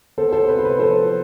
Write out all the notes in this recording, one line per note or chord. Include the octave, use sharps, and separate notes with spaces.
B3 A4 C5
A4 C5
C3 B4
C5
B4
F3 A4 C5